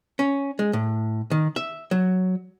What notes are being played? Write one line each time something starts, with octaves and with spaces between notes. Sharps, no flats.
C#4
G#3
A2
D#3
E5
F#3